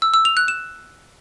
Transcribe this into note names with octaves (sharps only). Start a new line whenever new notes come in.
E6
E6
F7
F#6
E7